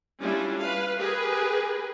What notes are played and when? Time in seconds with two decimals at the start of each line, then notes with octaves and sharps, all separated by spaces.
0.20 G3 C#4 D4 E4 F4
0.58 B4 F5
0.97 G4 G#4 A#4 B4 G#5